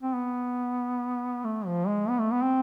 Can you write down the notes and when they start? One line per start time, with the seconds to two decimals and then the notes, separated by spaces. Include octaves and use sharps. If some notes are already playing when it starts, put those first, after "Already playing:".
0.03 C4
0.15 B3
1.45 A3
1.67 F3
1.87 G#3
2.09 B3
2.20 A3
2.31 B3
2.42 C4